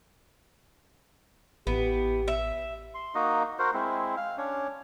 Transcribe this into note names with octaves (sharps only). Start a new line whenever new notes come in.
A1 B3 E4 G4
E5
C6
A#3 D#4 F#4 D#5
F#4 A#4 C5
G#3 C4 E4
F5
C#4 D4 C#5